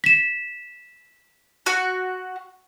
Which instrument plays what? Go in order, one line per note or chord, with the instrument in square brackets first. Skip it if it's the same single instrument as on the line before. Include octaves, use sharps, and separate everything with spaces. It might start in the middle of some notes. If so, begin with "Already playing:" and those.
[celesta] B6 E7
[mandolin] F#4